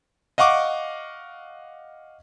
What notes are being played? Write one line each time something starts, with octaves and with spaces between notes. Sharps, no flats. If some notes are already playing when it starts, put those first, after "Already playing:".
D#5 F5 F#5 C#6 D6